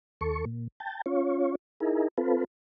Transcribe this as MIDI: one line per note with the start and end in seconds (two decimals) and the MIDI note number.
0.21 0.45 39
0.21 0.45 69
0.21 0.45 85
0.46 0.68 46
0.80 1.01 79
0.80 1.01 81
1.06 1.55 61
1.06 1.55 65
1.06 1.55 73
1.80 2.08 63
1.80 2.08 64
1.80 2.08 68
1.80 2.08 70
2.18 2.44 60
2.18 2.44 65
2.18 2.44 69
2.18 2.44 71